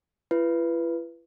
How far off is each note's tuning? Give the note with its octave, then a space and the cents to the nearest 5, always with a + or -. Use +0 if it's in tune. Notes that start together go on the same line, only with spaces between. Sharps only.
E4 +45 B4 +0